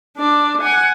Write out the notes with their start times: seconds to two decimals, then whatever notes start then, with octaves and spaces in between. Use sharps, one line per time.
0.17 D4 D5
0.62 F#5 G#5